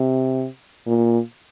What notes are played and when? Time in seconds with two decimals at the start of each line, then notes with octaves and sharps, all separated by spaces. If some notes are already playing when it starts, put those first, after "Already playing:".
Already playing: C3
0.86 A#2